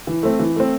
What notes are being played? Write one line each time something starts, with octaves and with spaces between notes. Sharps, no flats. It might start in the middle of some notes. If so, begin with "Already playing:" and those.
E3
A3 C4
E3
A3 C4